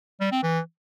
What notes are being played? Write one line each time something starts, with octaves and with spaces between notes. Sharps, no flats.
G3
C4
E3